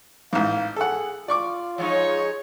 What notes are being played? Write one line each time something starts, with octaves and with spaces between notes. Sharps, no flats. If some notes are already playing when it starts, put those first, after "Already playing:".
A1 G#2 F5
G#4 A4 F#5
F4 D5 C#6 D6
F3 G#3 D#4 C#5